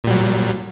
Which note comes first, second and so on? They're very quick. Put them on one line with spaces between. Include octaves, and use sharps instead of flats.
A#2 G3 F#3